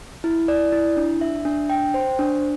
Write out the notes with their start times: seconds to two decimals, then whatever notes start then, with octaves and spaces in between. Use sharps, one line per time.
0.24 E4
0.48 D5
0.72 E4
0.97 D4
1.21 E5
1.45 D4
1.70 G5
1.94 C5
2.19 D4